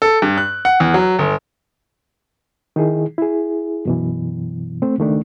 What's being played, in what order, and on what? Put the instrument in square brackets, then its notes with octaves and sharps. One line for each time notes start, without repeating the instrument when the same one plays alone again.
[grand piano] A4
G2
F#6
F#5
E2
F#3
G1
[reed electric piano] D#3 D#4 E4 G#4
E4 G#4
F#2 B2 E3
A3 C4
C#2 D#3 A3 D4